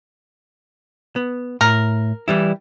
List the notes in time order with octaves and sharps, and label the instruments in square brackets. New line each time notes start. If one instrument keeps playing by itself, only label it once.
[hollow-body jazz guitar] B3
[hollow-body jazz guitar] A2 [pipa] A#4
[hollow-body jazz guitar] E3 G3 E4